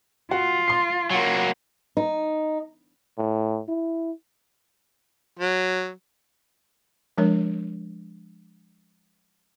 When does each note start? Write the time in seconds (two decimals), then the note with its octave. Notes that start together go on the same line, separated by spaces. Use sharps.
0.31 F4 F#4
0.68 C6 C7
1.10 F#3 A#3
1.97 D#4
3.18 A2
3.68 E4
5.39 F#3
7.18 F3 G#3 D4 A#4 C#5